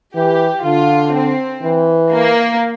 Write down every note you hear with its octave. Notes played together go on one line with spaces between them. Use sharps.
E3 G4
D3 F4
C4
E3
A#3